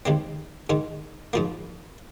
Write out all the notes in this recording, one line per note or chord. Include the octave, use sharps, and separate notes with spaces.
D#2 D#3 G#3 C4
G#2 D#3 G#3
G#2 F3 A#3